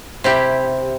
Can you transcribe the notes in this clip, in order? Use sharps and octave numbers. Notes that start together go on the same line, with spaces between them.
C3 E4 G4